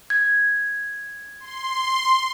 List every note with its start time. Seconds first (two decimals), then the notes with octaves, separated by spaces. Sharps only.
0.10 G#6
1.40 C6